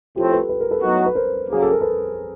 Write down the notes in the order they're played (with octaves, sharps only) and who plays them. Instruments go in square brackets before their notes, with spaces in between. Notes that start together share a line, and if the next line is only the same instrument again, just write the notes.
[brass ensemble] A2 F3 A3 C4 [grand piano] F4 G4
[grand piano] A4 B4
B4
A#4
A4 B4
[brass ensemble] A2 F#3 B3 D#4 F#4
[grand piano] B4
A#4 C5
[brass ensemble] C#3 F#3 A#3 [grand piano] G#4
[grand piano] A4
A#4
A4 B4